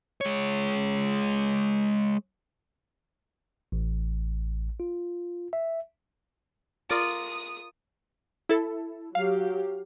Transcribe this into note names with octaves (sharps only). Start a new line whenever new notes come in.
G#3 C#5
A1
F4
E5
F4 A#4 D5 D#6
E4 A4
F#3 G4 F5